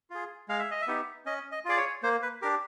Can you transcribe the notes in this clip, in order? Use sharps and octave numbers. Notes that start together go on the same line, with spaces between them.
F4 G#4
G#3 F5
E5
D#5
E5
B3 D#4 G4
C#4 D#5
D#5
F4 G#4 D5
C#5
A#3 C5
B4
D4 G4 A#4